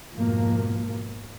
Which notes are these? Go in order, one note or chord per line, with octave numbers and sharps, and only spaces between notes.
F2 G#2 B2 F3 A#3